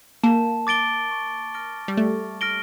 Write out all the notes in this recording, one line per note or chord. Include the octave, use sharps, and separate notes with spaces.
A#3 A5
D6 A6 D7 G7
C#6
F6 A#6 D7 G7
G3
A3 C#6
F6 A#6 D7 G7